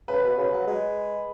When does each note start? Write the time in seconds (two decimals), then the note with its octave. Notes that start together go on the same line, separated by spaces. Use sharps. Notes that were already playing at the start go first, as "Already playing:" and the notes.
0.08 C#3 B4
0.24 B2
0.38 C#3
0.53 F#3
0.67 G#3